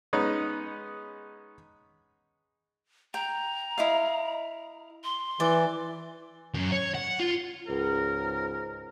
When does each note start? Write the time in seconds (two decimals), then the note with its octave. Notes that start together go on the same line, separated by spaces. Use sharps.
0.13 G#3 B3 C#4 D#4 B4
3.14 G5 A#5
3.78 E4 D#5 F5
5.04 C6
5.40 E3 D5
6.54 F#2
6.72 C#5
6.95 F#5
7.20 F4
7.68 C#2 G#2 A#4